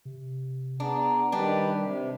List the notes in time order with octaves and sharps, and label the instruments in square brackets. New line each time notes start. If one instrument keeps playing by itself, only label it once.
[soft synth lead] C3
[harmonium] B3 G#4 [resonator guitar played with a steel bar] D4 [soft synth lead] A#5
[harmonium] D#3 G4 B4 [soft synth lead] G3 [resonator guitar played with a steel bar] D4
[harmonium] C3